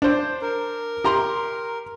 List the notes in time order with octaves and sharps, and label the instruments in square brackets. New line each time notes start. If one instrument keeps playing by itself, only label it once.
[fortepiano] D4 C5
[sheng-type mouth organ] A#4
[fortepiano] G4 A#5 C6